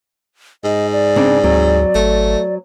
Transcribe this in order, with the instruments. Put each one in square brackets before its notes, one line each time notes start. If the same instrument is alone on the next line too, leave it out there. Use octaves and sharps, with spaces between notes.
[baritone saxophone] G#2 [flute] D#5
[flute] D5
[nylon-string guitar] C#3 C4 D4
[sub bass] D2 [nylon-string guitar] F#3 C4
[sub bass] G#1 [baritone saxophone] A3